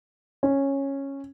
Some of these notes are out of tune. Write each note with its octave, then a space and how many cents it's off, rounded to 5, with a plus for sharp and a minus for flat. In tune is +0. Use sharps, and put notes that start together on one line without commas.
C#4 -10